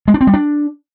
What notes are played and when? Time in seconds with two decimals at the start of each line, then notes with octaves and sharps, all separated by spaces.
0.08 G#3
0.14 D4
0.21 C4
0.27 G3
0.34 D4